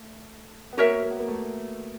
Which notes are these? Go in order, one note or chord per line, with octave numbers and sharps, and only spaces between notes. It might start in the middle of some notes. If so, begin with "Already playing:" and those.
Already playing: A3
B3
A#3 F#4 A#4 C#5 E5
A#3
B3
A#3
A3